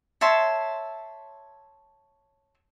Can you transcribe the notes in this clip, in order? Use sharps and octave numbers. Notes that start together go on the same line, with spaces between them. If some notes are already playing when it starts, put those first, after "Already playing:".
C#5 E5 A5 C6